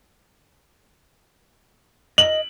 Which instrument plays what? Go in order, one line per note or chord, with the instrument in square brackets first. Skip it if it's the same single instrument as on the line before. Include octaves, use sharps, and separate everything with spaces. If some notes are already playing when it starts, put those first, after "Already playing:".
[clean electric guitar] D#5 [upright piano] F#7